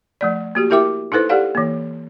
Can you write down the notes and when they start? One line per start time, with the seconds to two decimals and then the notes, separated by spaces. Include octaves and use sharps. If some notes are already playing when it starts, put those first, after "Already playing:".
0.21 F3 A3 D5
0.55 A#3 F#4 G4
0.70 E4 G4 A#4 E5 G5 D6
1.12 D#4 E4 A4 B4 C5
1.29 G4 A4 D5 F5 F#5
1.55 E3 A#3